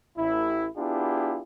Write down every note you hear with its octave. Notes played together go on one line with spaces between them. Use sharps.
A1 E4
B3 D4 E4 F4 G4 G#4